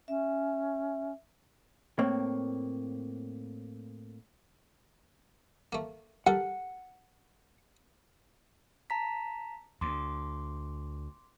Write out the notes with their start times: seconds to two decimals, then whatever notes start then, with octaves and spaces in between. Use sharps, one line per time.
0.08 C#4 E5
1.99 A2 A#3 C4 C#5
5.73 A3 A#3
6.27 G3 A4 A#4 F#5
8.90 A5 A#5 B6
9.81 D2 C6 D6